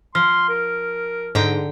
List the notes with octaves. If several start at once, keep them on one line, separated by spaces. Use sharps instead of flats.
F3 C6 F6
A#4
G#2 D3 G5 A#5